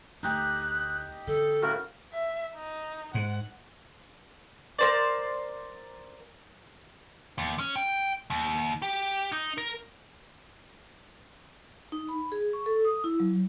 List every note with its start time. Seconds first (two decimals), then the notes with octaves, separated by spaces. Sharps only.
0.23 D2 D#4 G4 F#6
1.27 D3 A4
1.62 A2 C#3 F#4 A#4
2.14 E5
2.56 D#4
3.14 G#2 F#5
4.79 A#4 C5 D5
7.38 D#2
7.59 C#4
7.76 G5
8.30 D#2
8.82 G4
9.32 D#4
9.58 A#4
11.92 D#4
12.09 B5
12.32 G#4
12.53 C#6
12.66 A4
12.85 D#6
13.04 E4
13.20 F#3